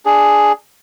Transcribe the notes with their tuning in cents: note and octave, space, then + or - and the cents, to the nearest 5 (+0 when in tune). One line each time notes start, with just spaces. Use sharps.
D4 +0 G#4 +0